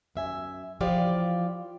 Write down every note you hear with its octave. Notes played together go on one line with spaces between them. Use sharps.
F#2 E5 G#5
E3 F3 F4 G4 D5